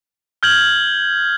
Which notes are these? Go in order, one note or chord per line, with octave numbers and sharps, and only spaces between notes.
F6 G6 G#6 F#7